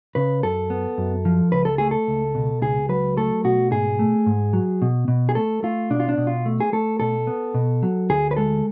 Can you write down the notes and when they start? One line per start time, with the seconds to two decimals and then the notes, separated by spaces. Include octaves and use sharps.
0.15 C#3 B4
0.43 F#2 A4
0.70 B3
0.98 F#2
1.25 F3
1.52 C#2 B4
1.65 A4
1.78 A3 G#4
1.91 A4
2.08 C#2
2.35 B2
2.62 C#2 G#4
2.89 F#3 B4
3.17 A3 A4
3.44 B2 F#4
3.71 G#2 G#4
3.99 A3
4.26 G#2
4.53 F#3
4.82 B2
5.08 B2
5.29 G#4
5.35 A3 A4
5.63 A3 F4
5.90 B2 D4
6.00 F4
6.09 D4
6.18 B2
6.27 F4
6.46 A3
6.60 G#4
6.73 A3 A4
7.00 B2 A4
7.27 B3
7.54 B2
7.83 F#3
8.10 D2 G#4
8.31 B4
8.37 G#3 A4